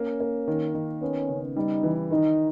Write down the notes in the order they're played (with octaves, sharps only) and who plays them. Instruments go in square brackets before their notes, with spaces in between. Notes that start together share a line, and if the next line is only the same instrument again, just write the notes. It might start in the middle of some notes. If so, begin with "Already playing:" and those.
Already playing: [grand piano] A#3 [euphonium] C#4
[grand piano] A#3
D#3
D#3
[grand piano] B3 [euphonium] C#4
[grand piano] C#3
[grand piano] G3 [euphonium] D#4
[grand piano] E3
[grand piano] D#3 [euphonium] D#4